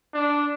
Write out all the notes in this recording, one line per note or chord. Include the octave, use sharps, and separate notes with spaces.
D4